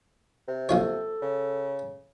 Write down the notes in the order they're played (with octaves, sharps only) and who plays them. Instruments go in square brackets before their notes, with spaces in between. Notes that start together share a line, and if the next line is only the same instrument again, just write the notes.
[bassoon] C3
[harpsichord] A#1 F4 C#5 [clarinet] A4
[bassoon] C#3